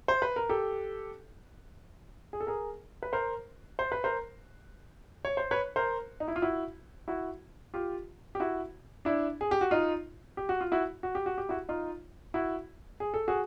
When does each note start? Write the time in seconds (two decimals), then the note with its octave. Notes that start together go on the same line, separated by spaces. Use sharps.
0.08 C5
0.22 B4
0.36 A#4
0.49 G4 A4
2.33 G#4
2.40 A4
2.47 G#4 A#4
3.03 B4
3.13 A#4 C5
3.79 C5
3.92 B4
4.04 A#4 C5
5.25 C#5
5.37 C5
5.51 B4 C#5
5.76 A#4 C5
6.20 D#4
6.28 E4
6.36 F4
6.42 E4 F#4
7.08 E4 F#4
7.74 F4 G4
8.35 G4
8.40 E4 F#4
9.05 D4 E4
9.41 G#4
9.51 G4
9.61 F#4
9.71 D#4 F4
10.37 G4
10.49 F#4
10.61 F4
10.72 E4 F#4
11.03 F#4
11.15 G4
11.26 F#4
11.38 G4
11.49 E4 F#4
11.69 D#4 F4
12.34 E4 F#4
13.00 G#4
13.14 A4
13.28 F#4 G#4